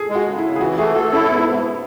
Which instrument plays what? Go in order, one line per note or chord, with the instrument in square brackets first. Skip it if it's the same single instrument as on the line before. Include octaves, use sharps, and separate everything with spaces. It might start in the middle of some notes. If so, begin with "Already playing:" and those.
Already playing: [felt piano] G#4 A4
[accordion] G#3
[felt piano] F#4
[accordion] C#3
[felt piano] E4
[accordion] C#3
[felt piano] G#4
[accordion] E3 [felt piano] F#4
[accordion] A3 [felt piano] G#4
[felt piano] F#4 [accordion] A4
[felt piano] C#4 [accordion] E4
[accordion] G#2 [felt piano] B3
[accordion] G#2